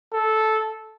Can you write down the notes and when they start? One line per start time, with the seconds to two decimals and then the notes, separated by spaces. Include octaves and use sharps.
0.13 A4